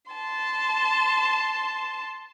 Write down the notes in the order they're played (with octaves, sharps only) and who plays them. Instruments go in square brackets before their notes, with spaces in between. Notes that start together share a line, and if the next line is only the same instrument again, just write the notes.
[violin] A5 C6